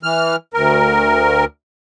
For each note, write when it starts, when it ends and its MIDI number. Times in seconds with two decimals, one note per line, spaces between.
0.03 0.36 52
0.03 0.36 89
0.54 1.45 38
0.54 1.45 70